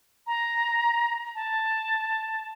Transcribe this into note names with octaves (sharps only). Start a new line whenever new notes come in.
A#5
A5